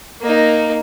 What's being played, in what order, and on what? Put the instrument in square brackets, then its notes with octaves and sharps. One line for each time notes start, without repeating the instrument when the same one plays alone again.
[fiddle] A#3 D#4